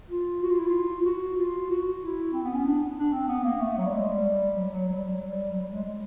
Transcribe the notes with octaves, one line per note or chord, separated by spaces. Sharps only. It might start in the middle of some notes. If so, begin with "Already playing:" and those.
F4
F#4
F4
E4
F4
F4
F#4
F4
F#4
E4
C4
B3
C#4
D4
D4
C4
B3
A#3
A3
F#3
G3
G#3
G3
F#3
G3
F#3
F#3
G3
F#3
G3
F#3
G3
G#3
G#3